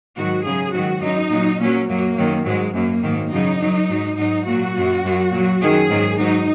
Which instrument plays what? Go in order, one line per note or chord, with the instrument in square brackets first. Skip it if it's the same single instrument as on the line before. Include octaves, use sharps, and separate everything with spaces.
[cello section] G#2 D#3 F#3 F#4
F#2 C#3 F#3 G#4
G#2 D#3 F#3 F#4
F#2 F#3 D#4
A#2 F#3
A#2 F#3 C#4
F#2 F#3 A#3
F#2 D#3 F#3
G#2 F#3 G#3
F#2 F#3 A#3
G#2 D#3 F#3
F#2 C#3 F#3 D#4
F#2 F#3
G#2 F#3
G#2 F#3 D#4
A#2 F#3 F#4
F#2 F#3
F#2 F#3
A#2 F#3
F#2 D#3 F#3 G#4
G#2 D#3 F#3
G#2 F#3 D#4